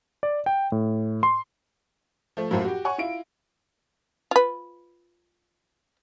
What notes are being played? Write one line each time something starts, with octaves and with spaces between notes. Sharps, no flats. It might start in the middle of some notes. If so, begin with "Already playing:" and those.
D5
G5
A2
C6
F3 A3
F#2 A2 F3 F#3 A#3
F#4 G4
C#5 F#5 G#5 C#6
E4 F4 D7
F4 B4